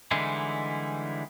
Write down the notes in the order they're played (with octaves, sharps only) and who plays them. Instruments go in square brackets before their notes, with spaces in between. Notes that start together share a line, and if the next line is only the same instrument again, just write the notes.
[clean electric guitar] D3 E3 G3 G#3 D#4 E4